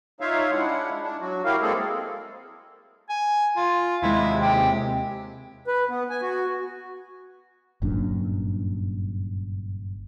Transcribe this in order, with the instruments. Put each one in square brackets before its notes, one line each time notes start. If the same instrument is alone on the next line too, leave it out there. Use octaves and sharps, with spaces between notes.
[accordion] D#4 F4 C#5 E5 F5
G#3 D4 E4 F#5
D4
F#3 F#4
E4 F#4 G4 A#4 F5
G#3 A#3 C4 G#4 A4
[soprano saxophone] G#5
F4
[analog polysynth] D#2 C3 G#3 [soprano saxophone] E4
[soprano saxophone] G4
[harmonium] B4
B3
G#5
F#4
[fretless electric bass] G1 F#2 A#2 D4